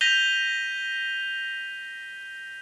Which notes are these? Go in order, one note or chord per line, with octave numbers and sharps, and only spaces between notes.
G6 A#6 B6 D#7 F7 G7